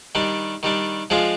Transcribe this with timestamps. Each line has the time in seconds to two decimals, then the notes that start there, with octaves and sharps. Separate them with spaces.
0.15 D#3 G3 D4
0.63 D#3 G3 D4
1.10 F3 G#3 D4 F4 G#4